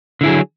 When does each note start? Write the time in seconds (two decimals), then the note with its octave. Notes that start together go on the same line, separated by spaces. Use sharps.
0.21 D3
0.23 E4
0.26 G#4
0.29 F#3